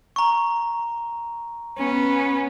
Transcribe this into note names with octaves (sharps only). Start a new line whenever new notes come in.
A#5 C#6
B3 C#4